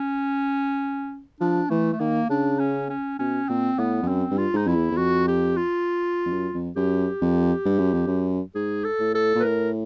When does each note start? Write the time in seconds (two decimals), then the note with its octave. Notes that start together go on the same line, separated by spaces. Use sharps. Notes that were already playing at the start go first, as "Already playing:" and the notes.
Already playing: C#4
1.41 F3 D4
1.70 E3 A3
1.93 A3
2.00 D#3 A#3
2.30 C#3 D4
2.59 C#4
2.90 C#4
3.19 B2 C#4
3.49 A#2 C4
3.78 A2 B3
4.03 F2
4.08 F#2 C4
4.31 G2
4.38 F4
4.54 G#2 D#4
4.67 F2 E4
4.75 E2
4.91 E2
4.97 F2 F#4
5.28 G4
5.57 F4
6.25 F2
6.32 F#2
6.54 F2
6.76 F#2 G4
7.21 F2
7.65 G2
7.79 F#2
7.94 F2
8.07 F#2
8.55 G#2 G#4
8.84 A4
9.00 A2
9.15 A4
9.35 A#2
9.40 B4
9.43 A2 A#4